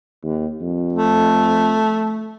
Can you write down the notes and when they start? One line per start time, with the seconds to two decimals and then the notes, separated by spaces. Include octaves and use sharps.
0.24 D#2
0.62 F2
0.93 A3